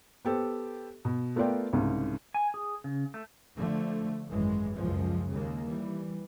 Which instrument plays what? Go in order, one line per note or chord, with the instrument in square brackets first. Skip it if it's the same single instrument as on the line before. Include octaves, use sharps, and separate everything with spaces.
[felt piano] B3 G4 A4 C5
B2
A3 B3 F4 A#4 D5 G5
C2 G#2 C#3
[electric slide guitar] G#5
G#4
C#3
A3
[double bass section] D3 F3 A3
G#1 F#2 E3 G#3
C#2 F#2 F3 G#3
D#2 C#3 G#3 A#3
E3 G3